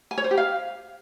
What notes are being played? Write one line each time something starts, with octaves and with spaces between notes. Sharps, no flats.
G#5
C#5
C5
G4
F5